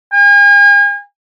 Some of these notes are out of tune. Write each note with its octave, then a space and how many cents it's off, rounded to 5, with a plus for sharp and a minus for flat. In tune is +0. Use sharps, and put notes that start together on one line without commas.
G#5 -40